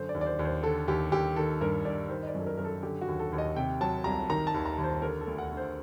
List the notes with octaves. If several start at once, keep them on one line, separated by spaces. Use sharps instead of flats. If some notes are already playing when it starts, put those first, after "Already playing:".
Already playing: F#2 D3 C5
D5
D#2
D5
C5
D#2
C5
D3 A4
D#2 G4
D#2 G4
D#3 A4
G2 A#4
G2 D5
D#3 C5
D#5
D5
F#2 A4
A#4
F#2 A#4
A4
D3 G4
F#4
D#2
A4
D#2
D#5
C3 G5
F#3 A5
C2 A#5
D#3 A#5
A5
D#2
A#5
D#2
C5
D3 A#4
A4
D2
F#5
D2
C5